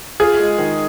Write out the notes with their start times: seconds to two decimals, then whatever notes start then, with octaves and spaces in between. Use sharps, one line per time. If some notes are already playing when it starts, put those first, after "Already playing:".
0.20 F4 G#4
0.39 G#3
0.58 D#3